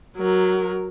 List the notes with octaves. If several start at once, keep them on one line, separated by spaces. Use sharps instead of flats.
F#3 A#4